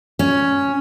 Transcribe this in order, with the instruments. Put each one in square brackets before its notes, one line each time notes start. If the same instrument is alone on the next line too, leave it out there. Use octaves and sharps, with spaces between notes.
[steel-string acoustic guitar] C#4